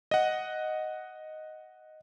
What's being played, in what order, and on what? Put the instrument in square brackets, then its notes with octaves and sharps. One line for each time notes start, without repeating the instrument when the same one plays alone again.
[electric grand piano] D#5 F#5